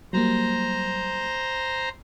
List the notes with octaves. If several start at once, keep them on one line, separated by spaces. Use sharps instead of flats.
F#3 G3 A#3 C5 A#5